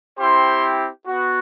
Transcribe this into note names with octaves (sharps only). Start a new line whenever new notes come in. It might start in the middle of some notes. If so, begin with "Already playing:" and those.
C4 E4 G4 C5 C6
B3 F#4